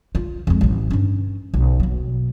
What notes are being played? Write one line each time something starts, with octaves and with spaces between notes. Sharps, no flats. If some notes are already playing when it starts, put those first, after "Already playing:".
F4
F2 G#3
A1 F#3
G2 C#4
B1
B2 F#3